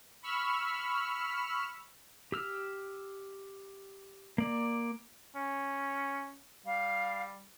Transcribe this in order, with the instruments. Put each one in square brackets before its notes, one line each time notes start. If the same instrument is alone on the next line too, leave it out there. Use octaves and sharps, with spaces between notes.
[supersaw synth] B5 C#6 E6 F6
[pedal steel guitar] G4 E6 F6
A#3 D5
[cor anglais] C#4
[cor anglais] G3 [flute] F5